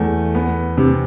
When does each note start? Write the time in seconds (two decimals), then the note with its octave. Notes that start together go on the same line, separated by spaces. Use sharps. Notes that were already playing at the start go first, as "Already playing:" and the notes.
Already playing: E2 A3
0.35 B3
0.78 C3